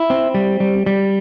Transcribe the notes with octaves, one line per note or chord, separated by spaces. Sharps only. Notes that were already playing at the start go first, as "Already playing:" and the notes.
Already playing: E4
C4
G3
G3
G3